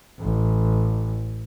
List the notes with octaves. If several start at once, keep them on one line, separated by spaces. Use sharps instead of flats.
A1